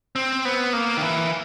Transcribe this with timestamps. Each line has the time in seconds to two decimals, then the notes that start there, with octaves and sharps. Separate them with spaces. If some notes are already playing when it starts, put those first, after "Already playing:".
0.16 C4
0.45 B3
0.73 A#3
0.97 D#3
1.02 E3